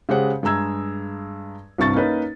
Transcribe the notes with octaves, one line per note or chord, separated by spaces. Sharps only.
C#3 G#3 G4 C5 F#5
G2 G#3 G#4 A#5 E6 G#6
C2 G2 C3 C#6 A6
A#3 C#4 D#4 B4